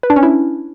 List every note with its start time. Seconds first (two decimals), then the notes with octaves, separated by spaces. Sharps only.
0.03 B4
0.10 D4
0.16 C#4
0.23 E4